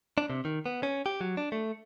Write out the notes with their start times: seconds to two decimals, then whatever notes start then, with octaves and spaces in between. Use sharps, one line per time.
0.18 D4
0.30 C3
0.45 D#3
0.66 B3
0.83 C#4
1.06 G4
1.21 F#3
1.37 D4
1.52 A3